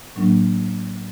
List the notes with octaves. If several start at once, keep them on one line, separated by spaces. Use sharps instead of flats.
A2 F#3 A#3 D4